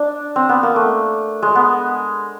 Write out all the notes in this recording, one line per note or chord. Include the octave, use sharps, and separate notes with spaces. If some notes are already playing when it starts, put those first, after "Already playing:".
Already playing: D4
C4
B3
A#3
A3
G#3
B3